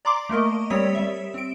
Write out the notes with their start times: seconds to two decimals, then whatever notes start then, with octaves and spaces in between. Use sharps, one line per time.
0.05 D5 A#5 C6 D6
0.29 A3 A#3 A#4 D#5
0.70 G3 C4 C#5 D#6 B6
0.95 G3 E5
1.34 C4 D7